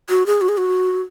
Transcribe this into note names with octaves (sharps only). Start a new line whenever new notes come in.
F#4
G#4
F#4
G#4
F#4